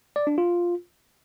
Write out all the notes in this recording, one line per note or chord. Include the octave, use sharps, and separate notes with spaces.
D5
D4
F4